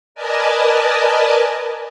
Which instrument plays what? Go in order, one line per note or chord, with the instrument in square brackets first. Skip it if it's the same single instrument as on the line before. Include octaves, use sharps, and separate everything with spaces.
[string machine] A#4 B4 D5 D#5 G#5 A5